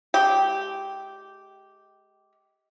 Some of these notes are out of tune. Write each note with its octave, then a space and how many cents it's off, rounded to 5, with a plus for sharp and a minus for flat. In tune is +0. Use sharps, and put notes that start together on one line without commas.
G#3 +25 G4 -10